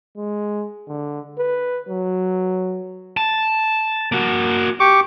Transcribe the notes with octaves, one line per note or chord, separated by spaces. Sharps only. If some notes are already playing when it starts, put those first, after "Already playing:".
G#3
D3
B4
F#3
A5
A#3 F#4
G4 C#6 D6